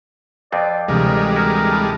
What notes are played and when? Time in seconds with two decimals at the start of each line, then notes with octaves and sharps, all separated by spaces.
0.52 F2 B3 C4 D5
0.88 D2 C3 E3 G3 G#3 A#4
1.36 E4 F#4 A#4
1.71 A5 B5 F#6